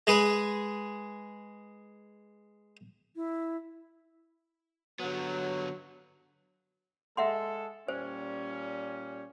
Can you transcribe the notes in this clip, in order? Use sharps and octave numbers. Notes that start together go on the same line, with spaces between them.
G#3 G#4 B4
E4
D3 F#3 B3
G#3 A4 E5 F#5 C6
A#2 G3 C#4 C5